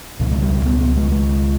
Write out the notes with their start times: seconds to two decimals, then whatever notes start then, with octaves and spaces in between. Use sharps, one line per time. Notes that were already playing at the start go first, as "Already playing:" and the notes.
0.20 C#2 B2
0.31 G#3
0.42 G3
0.54 G3
0.65 B3
0.81 B3
0.96 G#3
1.12 G#3